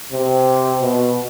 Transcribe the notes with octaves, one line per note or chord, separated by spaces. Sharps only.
C3
B2